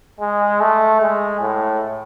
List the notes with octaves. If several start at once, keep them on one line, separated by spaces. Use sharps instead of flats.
G#3
A3
G#3
A2